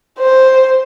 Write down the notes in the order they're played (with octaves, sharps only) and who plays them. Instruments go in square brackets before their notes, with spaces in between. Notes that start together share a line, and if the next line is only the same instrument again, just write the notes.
[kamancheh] C5